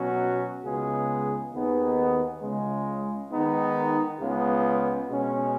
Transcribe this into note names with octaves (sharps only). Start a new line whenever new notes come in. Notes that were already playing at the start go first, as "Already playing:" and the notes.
Already playing: B2 F#3 C#4 F#4
C#2 C#3 G#3 B3 G#4
D#2 D#3 B3 D#4 G#4
C#2 C#3 G#3
D#3 G#3 B3 D#4
C#2 C#3 G#3 B3
B2 G#3 C#4